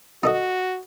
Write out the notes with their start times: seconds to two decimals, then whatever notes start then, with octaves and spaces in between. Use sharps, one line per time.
0.23 D#4 F#4 A4 D#5